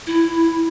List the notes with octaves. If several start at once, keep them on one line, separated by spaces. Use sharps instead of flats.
E4